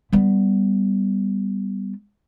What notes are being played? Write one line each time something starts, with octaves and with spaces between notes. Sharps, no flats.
G3 B3